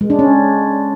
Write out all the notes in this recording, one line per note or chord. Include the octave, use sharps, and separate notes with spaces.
G#3
D4
C#4